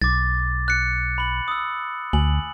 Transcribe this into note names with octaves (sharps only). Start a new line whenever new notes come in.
B1 D6 A6
F#6 C#7
B5 F#7
D#6 E6
D2 G#5 F#7